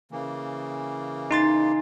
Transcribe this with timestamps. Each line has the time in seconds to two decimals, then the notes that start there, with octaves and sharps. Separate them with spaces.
0.11 C#3 E3 A#3
1.31 D#4 C6 A6